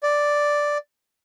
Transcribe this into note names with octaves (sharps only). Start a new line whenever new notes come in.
D5